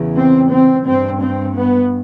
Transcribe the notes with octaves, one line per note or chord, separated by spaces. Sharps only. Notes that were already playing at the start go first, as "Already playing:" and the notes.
Already playing: E2 C#3
C4
C4
G2 C4
C4
B3